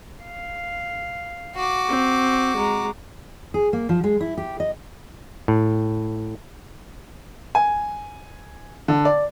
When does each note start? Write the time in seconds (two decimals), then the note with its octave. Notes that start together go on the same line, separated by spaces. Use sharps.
0.24 F5
1.56 F#4 D6
1.88 C4
2.56 G#3 A#5
3.54 G#4
3.73 A#3
3.89 F3
4.04 G#3
4.21 E4
4.38 G4
4.60 D#5
5.48 A2
7.55 G#5
8.88 D3
9.05 D5